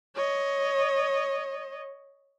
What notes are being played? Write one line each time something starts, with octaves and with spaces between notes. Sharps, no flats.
C#5 D#5